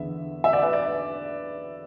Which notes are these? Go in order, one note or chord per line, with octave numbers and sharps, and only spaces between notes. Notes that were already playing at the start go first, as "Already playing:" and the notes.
Already playing: E2 D3 B3 E5
E5
D5
B4
D5